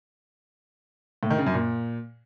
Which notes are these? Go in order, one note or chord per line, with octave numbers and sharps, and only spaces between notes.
A2
D#3
C#3
F#2
A#2